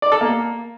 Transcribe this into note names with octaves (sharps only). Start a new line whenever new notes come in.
D5
A4
A#3